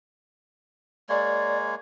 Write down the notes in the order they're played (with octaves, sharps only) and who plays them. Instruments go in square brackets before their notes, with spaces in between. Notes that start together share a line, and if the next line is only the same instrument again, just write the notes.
[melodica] G#3 A#3 C#5 [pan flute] D5